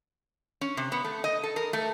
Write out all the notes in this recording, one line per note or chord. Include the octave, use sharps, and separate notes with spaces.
C#4
C3
B3
A3
D#5
A4
A#4
A3